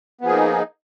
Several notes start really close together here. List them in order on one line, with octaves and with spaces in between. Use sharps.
B3 F3 G#4 A#3 D#4